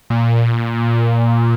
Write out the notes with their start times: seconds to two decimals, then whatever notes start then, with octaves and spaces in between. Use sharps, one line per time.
0.10 A#2